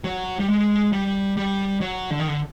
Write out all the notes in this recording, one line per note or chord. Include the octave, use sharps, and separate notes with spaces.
F#3
G3
G#3
G3
G3
F#3
D3
D#3
D3